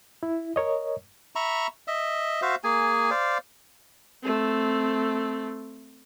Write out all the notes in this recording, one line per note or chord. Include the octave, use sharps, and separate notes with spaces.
E4
A#4 C#5 D#5
E5 A#5 B5 C#6
D#5 E5
F#4 C5 E5 F5
A#3 G#4 G#5
C5 D5 F5
A3 C4